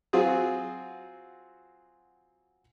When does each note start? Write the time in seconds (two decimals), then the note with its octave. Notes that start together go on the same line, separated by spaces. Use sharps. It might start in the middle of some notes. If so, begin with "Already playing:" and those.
0.13 F#3 C4 F4 F#4 G#4